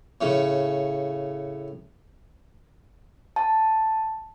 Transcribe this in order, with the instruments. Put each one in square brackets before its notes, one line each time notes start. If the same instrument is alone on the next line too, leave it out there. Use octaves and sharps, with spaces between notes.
[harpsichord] A2 C#3
[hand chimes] A5